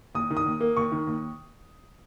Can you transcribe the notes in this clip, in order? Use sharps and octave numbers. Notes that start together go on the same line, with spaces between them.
D#2 D#6
D#3
D#6
D#2
A#3
D#2 C#6
D#3
D#2